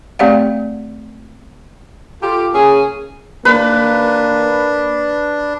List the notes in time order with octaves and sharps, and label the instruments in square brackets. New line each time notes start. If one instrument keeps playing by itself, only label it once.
[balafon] A3 C4 G4 D5 F5 F#5
[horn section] F4 G4 A4
C#3 A#3 C#4 G#4
[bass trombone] A#3 [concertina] D4 [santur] B4